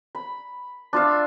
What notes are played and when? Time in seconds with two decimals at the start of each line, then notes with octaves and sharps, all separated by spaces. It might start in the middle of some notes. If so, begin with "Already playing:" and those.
0.15 B5
0.93 D4 F4 E5 F5